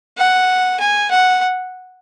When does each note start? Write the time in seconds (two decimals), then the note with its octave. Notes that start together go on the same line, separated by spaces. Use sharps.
0.18 F#5
0.80 G#5
1.11 F#5